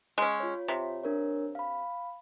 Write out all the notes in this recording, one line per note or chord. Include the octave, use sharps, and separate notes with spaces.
G#3 C#4
F4 C#5
C3
D4 A#4 C#5
F5 B5